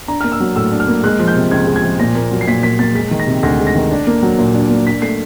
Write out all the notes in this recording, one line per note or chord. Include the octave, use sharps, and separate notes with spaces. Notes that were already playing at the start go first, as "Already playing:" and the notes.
D4 A#5
A#3 F6
E6
F#3
A2 E6
D4
F6
A#3
G#3 F#6
F3
G6
C3
C#2 G#6
G#3
G#6
F3
A#2 A#6
A#3
F#3
C7
A#2 B6
A#2 B6
A#3 A6
G#3 B6
D#3
A#6
C3
D2 A#6
G#3
A#6
D#3
D4
A#3
F#3
A#2
D4
A#3
D4 B6
A3 C7